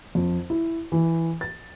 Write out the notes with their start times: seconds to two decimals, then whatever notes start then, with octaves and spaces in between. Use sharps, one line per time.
0.15 F2
0.50 E4
0.92 E3
1.41 A6